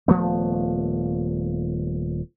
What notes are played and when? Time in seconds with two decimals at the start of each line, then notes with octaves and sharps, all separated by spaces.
0.08 D#1 F3 A3 B3